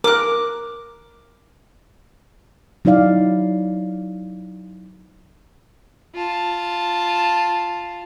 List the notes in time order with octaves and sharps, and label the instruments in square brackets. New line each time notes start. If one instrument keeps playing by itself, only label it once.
[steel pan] A#4 [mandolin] D6 F#6
[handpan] F#3 D#4 E4 D5 F5
[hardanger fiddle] F4 A5